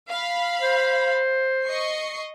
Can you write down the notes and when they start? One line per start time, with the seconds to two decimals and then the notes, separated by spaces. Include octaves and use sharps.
0.11 F5 B5
0.61 C5
1.64 D#5 C#6 C7